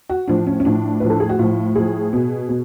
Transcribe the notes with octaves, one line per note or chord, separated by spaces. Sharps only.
F#4
A2 F3 D4
C#4
C#4
A2 F3 D4
A2 F3 B4
A4
G#4
F#4
A2 F3 F4
A2 F3 G#4
B2
B2